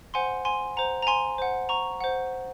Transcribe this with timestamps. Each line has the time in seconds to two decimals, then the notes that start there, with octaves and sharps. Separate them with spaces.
0.14 C5 F#5 G#5 C6
0.45 G#5 C6
0.76 C5 F#5 A#5
1.02 A#5
1.07 G#5 C6
1.38 C5 F#5
1.69 A#5 C#6
2.01 C5 F#5